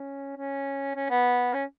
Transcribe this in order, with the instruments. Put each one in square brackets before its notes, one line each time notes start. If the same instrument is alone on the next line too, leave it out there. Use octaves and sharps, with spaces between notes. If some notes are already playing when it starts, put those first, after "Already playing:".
Already playing: [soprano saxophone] C#4
C#4
C#4
B3
C#4